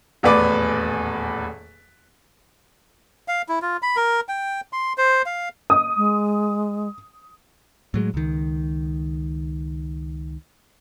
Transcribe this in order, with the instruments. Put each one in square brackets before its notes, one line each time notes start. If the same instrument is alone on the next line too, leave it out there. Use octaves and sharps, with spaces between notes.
[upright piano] D#1 E2 A2 B4 D5 D6
[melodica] F5
E4
F4
B5
A#4
G5
C6
C5
F5
[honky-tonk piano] D#6
[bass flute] G#3
[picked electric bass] A2 F#3 G#3
C#2 D#3